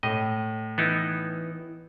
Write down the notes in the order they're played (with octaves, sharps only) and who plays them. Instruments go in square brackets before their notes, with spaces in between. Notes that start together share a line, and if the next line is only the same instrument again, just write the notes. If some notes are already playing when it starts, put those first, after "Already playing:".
[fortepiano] A2 [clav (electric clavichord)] D#5
[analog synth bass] E3 [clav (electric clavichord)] B3 D#4 E4